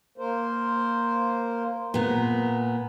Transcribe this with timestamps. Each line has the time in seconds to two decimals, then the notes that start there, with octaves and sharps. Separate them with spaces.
0.18 A#3 A#4 C5
1.94 A#2 B3 A#5